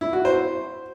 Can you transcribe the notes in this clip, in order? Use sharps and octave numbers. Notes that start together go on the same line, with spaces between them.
E4
F#4
C5